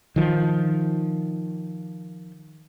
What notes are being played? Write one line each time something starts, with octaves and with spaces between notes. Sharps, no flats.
D#3 F3